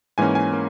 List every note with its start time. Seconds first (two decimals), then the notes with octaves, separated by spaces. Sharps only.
0.18 G#2 E3 A#3 C#4 G#5
0.35 G#5
0.53 A#3 C#4